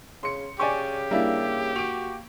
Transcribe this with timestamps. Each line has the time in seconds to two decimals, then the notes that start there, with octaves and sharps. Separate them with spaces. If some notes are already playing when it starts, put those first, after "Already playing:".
0.23 C#3 C6 C#7
0.60 C#3 G4 D5 G#5 C#6
1.11 G3 A#3 D4 E4
1.76 F#4 D7 F7